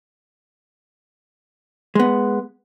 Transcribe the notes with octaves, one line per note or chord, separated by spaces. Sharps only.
G#3 B3